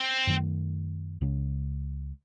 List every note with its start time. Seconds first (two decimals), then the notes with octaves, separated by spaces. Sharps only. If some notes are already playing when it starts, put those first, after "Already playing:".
Already playing: C4
0.27 F#2 D#3 A3
1.21 C#2 C#3 G#3 C#4